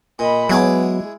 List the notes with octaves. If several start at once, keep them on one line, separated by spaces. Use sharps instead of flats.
A#2 D#5 B5
F#3 G#3 B3 E4 G#4 D6